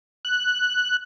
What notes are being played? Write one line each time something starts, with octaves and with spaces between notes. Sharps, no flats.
F#6